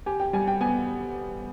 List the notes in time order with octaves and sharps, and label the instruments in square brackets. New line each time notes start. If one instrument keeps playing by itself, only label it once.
[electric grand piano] G4 [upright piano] G#5
[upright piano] G5
[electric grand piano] G3 [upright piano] G#5
[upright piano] G5
[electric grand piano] B3 [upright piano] G#5